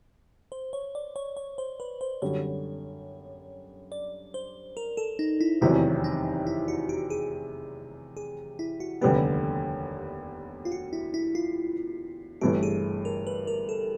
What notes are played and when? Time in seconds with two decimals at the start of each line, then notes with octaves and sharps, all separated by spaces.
0.52 C5
0.73 C#5
0.95 D5
1.16 C#5
1.37 C#5
1.58 C5
1.80 B4
2.01 C5
2.22 F#2 D3 G3 C#5
3.92 D5
4.34 C5
4.77 A#4
4.97 A4
5.19 D#4
5.41 E4
5.61 F1 E2 C3 D#3 F#3 E4
6.04 D#4
6.47 E4
6.68 F#4
6.89 G4
7.10 G#4
8.17 G#4
8.59 E4
8.80 F#4
9.01 F1 D#2 D3 G3 B3 G4
10.65 F4
10.72 F#4
10.93 E4
11.14 E4
11.35 F4
12.41 G1 G2 E3 A3 G4
12.63 G#4
13.05 A#4
13.27 B4
13.47 A#4
13.69 A4